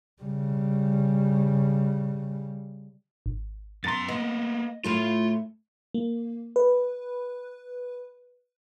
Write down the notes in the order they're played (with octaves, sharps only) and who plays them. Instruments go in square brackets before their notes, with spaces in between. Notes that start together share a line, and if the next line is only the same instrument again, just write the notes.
[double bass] C#3 G3
[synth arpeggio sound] G#1
[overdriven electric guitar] F#2 C6 [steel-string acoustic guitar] B3 F#5 [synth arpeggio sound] A#5 A6
[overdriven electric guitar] A#3 B3 [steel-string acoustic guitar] D#5
[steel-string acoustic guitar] A2 A3 E4 [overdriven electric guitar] F4 C6
[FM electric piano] A#3
B4